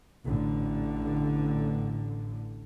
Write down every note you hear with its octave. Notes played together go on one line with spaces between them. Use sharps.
A1 D3